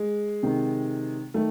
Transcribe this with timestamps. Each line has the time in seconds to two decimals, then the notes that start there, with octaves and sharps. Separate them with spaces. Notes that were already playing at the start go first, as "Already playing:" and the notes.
Already playing: G#3
0.43 C3 D#3
1.34 D#3 A3